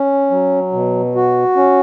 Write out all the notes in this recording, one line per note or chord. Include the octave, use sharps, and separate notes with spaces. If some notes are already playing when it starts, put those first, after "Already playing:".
Already playing: C#4
F#3
B2
F#4
C#4